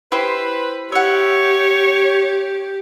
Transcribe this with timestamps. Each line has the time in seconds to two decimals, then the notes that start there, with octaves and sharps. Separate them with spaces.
0.12 E4 G4 B4 C5
0.92 G4 C#5 E5 F#5